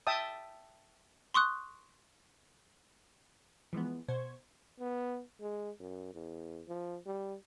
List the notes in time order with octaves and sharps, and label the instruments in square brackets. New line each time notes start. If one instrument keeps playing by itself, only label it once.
[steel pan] E5 G5 A5 D#6
[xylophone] C6 C#6 D#6 F#6
[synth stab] E3 F3 G#3 B3
B2 C5 C#6 G#6
[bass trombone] B3
G#3
F#2
E2
F3
G3